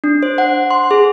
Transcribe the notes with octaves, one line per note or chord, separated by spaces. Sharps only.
D4
C5
F#5
C6
G#4